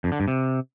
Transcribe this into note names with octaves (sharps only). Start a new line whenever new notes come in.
F2
D3
G2
C3